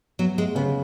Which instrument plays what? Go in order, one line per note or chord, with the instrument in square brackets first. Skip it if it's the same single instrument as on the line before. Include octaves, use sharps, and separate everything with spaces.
[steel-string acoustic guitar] F#3 [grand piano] B3
[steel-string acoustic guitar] G#3
[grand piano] C#3 [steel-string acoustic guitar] B3